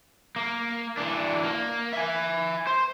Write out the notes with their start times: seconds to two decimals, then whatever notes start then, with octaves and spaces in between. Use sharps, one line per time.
0.36 A#3
0.97 E3 D4
1.44 A#3
1.93 E5 G#5
2.67 C5